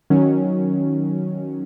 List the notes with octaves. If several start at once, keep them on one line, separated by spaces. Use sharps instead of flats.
D#3 F#3 C#4